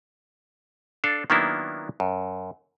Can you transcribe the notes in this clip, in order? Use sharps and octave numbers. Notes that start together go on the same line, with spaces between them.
D4 A4 F5
D#3 F#3 A#3 B3 D4 E4
F#2